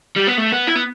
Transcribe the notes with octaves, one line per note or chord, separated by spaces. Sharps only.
G3
B3
A3
B3
E4
B3